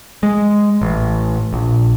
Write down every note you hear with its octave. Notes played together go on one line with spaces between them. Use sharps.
G#3
A1
A#1